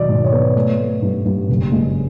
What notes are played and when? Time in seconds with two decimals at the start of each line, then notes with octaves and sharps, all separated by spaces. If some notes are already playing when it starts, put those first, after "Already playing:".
Already playing: E1 D#3 F#3 D5 D#5
0.09 G#2
0.24 C#5
0.32 B3
0.55 A3
0.78 A3
1.02 G2
1.25 G2
1.49 F#1
1.72 G#3